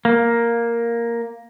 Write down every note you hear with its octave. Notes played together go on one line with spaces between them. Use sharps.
A#3